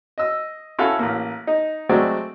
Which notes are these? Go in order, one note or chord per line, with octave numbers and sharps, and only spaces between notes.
D#5 E6
C#4 E4 F#4 A4 F5 F#5
A1 A#3
D#4
F#3 G#3 A3 C4 F#4 D5